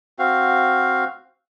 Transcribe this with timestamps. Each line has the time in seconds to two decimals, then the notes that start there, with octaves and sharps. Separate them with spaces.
0.19 C4 F#4 F5